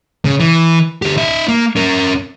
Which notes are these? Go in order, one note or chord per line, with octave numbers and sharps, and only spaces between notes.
C#3
E3
D3 G4
D#4 E5
A#3
C#4 A#4